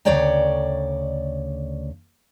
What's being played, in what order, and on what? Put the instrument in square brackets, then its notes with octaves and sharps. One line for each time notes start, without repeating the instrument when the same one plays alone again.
[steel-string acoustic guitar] D2 C#3 C#5 D5 G5 A#5